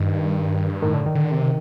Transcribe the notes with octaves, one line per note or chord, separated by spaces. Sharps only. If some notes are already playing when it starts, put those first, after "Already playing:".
Already playing: G2 D#3
A2 D#3
D3
D#3
D3
C3